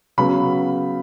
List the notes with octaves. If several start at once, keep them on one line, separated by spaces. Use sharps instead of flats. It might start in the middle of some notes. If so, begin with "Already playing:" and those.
C#3 F#3 B3 B5